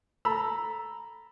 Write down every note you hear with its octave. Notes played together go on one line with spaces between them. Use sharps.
A4 A#5 B5 E6